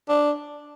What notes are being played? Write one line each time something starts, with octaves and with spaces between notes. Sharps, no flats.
D4